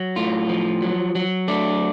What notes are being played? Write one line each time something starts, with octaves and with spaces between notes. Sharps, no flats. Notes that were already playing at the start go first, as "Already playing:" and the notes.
Already playing: F#3
A2 F4
F3
F#3
F#3
A3 D4